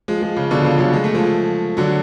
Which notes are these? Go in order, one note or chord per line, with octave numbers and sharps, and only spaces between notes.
F3 G#3
F3 G#3
C#3
B2 D3
C#3 F3
D3 F#3
G#3
A3
F3 G#3
D3 F#3